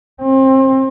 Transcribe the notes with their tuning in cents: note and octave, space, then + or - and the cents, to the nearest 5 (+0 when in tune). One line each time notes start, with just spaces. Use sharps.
C4 +30